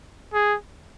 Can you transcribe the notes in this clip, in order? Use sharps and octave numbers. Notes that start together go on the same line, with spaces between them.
G#4